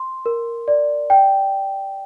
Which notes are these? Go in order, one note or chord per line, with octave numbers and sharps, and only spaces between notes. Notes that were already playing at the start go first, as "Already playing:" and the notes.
Already playing: C6
A#4
D5
G5